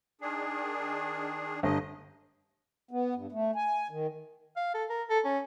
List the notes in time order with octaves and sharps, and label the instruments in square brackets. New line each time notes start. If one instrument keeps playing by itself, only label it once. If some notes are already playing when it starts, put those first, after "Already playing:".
[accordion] D#3 D4 G#4
[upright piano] G1 [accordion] D#5
[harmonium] B3
G2
A3
G#5
D#3
[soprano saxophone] F5
A4
A#4
A4
C#4